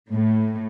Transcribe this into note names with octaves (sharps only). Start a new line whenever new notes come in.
A2